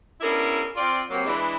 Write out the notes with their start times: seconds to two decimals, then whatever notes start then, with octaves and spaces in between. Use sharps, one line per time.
0.21 B3 C#4 D4 E4 G#4 A#4
0.76 C4 F4 D5
1.10 C3 F#3 A#3
1.25 E3 G#3 D4